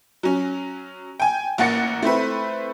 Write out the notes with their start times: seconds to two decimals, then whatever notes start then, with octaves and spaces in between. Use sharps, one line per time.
0.23 F#3 C#4
1.20 G5 G#5
1.58 A1 A#3 F#5 A6 C#7
2.03 A3 C4 E4 B4